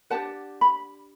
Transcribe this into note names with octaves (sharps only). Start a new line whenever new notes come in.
D4 G4 B4 F#5 A5
B5